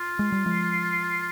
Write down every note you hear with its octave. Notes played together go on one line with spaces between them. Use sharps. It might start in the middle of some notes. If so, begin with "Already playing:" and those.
Already playing: F4
G#3
G3
F3 G#3